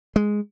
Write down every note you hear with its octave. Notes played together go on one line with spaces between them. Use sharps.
G#3